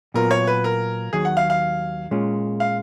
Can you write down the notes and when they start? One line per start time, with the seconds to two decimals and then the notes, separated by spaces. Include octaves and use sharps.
0.14 A#2 F#3 B3 F4 A#4
0.31 C#5
0.47 B4
0.64 A#4
1.13 D#2 D#3 F#3 G#4
1.25 F#5
1.37 F5
1.50 F5
2.11 A#2 G#3 C#4 F4
2.60 F5